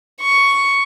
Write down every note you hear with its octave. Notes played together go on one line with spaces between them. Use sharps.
C#6